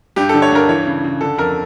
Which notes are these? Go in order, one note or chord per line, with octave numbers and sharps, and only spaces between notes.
G2 G4
A4
D3
C#5
G2 A#4
E3 C#5
C#3
C#3
D3 A4
F2 A#4